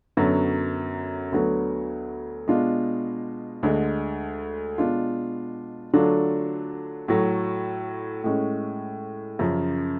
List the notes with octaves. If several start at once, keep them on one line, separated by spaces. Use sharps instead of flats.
F#2 D3 F#3 B3
D2 D3 F#3 B3
B2 G#3 D4 F4
D2 D3 G#3
B2 G#3 D4 F4
D3 F#3 A3 D4 F4
A2 F#3 A3
A2 G#3 C#4
F#2 C#3 F3